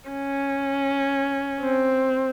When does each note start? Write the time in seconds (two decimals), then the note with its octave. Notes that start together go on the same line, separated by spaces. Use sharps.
0.10 C#4
1.61 C4